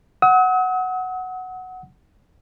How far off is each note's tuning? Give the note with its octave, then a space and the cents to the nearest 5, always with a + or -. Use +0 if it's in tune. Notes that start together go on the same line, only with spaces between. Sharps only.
F#5 +5 D#6 +45